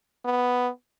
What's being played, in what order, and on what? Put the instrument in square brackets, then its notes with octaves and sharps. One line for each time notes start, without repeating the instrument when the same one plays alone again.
[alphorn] B3